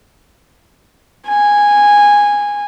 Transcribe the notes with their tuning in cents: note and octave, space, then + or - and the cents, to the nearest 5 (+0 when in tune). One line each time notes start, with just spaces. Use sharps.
G#5 -10